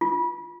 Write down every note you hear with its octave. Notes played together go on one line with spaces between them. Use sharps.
F4